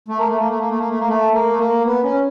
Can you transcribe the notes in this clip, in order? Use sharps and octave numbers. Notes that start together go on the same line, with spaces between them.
A3
A#3
A3
A#3
A3
A#3
A3
A#3
A3
A#3
A3
A#3
A3
A#3
B3
C#4